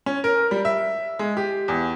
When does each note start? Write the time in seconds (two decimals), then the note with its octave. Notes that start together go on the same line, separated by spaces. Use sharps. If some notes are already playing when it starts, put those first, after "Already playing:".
0.06 C#4
0.24 A#4
0.51 G3
0.65 E5
1.19 G#3
1.37 G4
1.68 E2